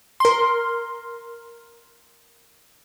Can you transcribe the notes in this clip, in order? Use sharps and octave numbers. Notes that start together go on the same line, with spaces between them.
A#4 C6